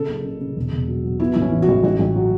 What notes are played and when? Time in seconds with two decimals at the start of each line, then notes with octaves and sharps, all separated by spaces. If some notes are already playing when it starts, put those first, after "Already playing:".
Already playing: C#3 A4
0.08 F#1
0.25 C#3
0.40 C#3
0.56 E1
0.72 E1
0.88 F#3
1.04 F#3
1.20 B3 E4
1.34 A1 E4
1.42 C#4
1.52 E3
1.62 F#4
1.68 A1
1.83 A1 F#4
1.99 A1
2.15 F#3